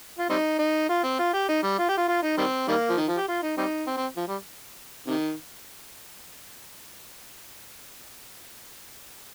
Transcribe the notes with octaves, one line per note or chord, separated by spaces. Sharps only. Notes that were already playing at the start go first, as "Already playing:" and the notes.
F4
G3 C4 D#4
D#4
F4
C4
F4
G4
D#4
G3
F4
G4
F4
F4
D#4
D#3 G3 C4
D#3 G3 A#3
F3
D#3
F3
G4
F4
D#4
G3 C4 D#4
C4
C4
F3
G3
C3 D#3